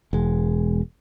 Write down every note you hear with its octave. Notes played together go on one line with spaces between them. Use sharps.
E1 G#3